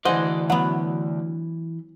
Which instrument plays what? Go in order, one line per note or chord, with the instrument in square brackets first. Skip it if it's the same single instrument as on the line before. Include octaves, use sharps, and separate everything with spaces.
[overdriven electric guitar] D2 D5 [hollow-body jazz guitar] E3 C5 [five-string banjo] G#4 F#5 [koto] D#5
[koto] F#3 B3 [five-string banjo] F#5